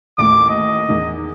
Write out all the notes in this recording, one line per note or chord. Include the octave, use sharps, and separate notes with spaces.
A1 D#2 A2 D6
D#5
E2 D#3